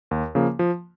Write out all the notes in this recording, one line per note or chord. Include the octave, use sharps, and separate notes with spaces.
D#2
C#3 F3 A#3
F3